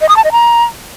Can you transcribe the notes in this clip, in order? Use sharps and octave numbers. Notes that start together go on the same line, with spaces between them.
D#5
D#6
A5
D#5
A#5